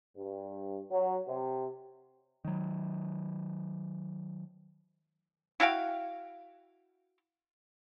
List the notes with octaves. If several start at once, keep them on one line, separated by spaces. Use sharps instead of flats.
G2
F#3
C3
D#3 F#3
E4 F#4 F5 G5